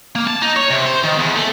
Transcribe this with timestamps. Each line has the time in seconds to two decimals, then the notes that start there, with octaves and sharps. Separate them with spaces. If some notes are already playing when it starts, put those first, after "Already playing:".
0.15 A#3
0.27 A5
0.42 D#4
0.56 C#5
0.71 C3
0.86 C5
1.04 D#3
1.19 E2
1.37 A3